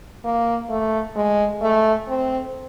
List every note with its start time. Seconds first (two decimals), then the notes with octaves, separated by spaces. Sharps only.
0.24 A#3
0.70 A3
1.16 G#3
1.62 A3
2.08 C4